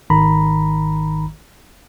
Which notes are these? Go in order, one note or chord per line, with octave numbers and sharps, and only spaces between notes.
G#1 D#3 A#5 B5